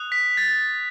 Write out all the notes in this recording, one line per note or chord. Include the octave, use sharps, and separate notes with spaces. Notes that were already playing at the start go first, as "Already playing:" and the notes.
Already playing: D#6 F#6
B6
A6